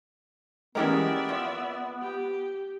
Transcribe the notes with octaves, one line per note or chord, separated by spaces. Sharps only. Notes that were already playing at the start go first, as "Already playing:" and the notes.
E3 G#3 B3 C#4 G4 A#4 D5 E5
F3
G4